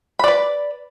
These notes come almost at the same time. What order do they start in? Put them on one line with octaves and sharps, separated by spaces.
B5 D5 B4